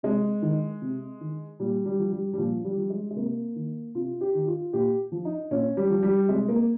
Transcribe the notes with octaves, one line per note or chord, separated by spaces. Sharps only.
C3 G#3
D#3
C3
D#3
A#2 G3
G3
F3
G3
G3
A#2 F3
G3
F3
G#3
G#3
C3 A#3
D#3
C3 F4
G4
D#3
F4
A#2 G4
F3
D#4
A#2 C#4
G3
F3
G3
C3 G#3
A#3